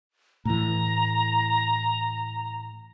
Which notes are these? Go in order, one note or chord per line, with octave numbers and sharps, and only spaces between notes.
A2 E3 A#5